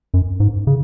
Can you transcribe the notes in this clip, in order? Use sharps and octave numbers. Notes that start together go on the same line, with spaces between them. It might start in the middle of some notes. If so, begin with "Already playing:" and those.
F#2
G#2
C#3